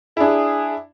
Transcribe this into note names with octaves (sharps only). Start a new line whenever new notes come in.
D4 E4 G#4